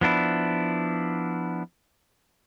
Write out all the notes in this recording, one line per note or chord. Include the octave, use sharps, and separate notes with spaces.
F3 B3 D4 E4